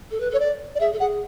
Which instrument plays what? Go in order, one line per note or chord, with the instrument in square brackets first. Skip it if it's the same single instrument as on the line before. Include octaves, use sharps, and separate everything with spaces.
[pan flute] A4
B4
[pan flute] A4 [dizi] C#5
[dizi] D5
D5
[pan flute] G#4 [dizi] E5
[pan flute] A4
[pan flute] G#4 [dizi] F#5